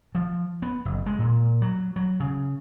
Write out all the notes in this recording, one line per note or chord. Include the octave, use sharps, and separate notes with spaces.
F3
B3
F#1
G#3
A#2
F#3
F#3
C#3